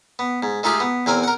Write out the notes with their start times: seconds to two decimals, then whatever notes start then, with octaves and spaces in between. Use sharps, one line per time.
0.19 B3
0.43 G#2
0.63 G#3 A3 D#4 F4 G4 G#4
0.80 B3
1.06 E2 C4 A#4 G#5
1.24 A#4 F#5